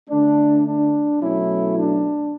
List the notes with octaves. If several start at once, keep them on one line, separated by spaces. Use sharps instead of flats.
D3 A3 D4
D4
B2 F#3 A3 C#4 E4
D4